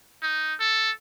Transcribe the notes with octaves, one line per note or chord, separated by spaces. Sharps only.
D#4
A4